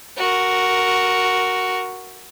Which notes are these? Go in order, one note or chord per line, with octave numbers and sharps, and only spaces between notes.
F#4 A#4